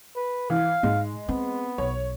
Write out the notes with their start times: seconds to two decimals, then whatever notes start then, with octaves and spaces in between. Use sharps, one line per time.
0.16 B4
0.50 E3 F5
0.83 G#2 G#3
1.29 B3 C4
1.78 B1 C#5